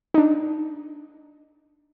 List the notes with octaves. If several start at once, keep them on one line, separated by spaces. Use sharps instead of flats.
D#4
D4